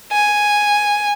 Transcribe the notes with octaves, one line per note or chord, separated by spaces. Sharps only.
G#5